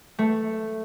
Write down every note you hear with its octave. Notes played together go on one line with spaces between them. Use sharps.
A3